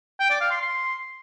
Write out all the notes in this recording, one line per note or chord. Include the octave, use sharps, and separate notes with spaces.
G5
D5
F5
C6
C6